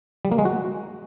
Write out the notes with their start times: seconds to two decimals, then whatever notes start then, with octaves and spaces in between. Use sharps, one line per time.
0.25 G3
0.32 A#3
0.38 G#3
0.45 F#4